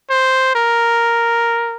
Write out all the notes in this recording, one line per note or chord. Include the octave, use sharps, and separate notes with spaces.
C5
A#4